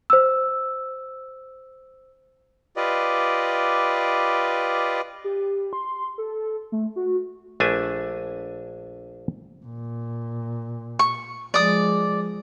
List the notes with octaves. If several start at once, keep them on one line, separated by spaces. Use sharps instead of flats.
C5 E6
F4 G4 B4 D5 D#5
G4
C6
A4
A3
F#4
A#1 A3 D4 E5 G#5
A#2
C#6
F3 G#3 D5 D#6